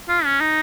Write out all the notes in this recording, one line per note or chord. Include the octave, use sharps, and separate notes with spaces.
F4
C#4
D#4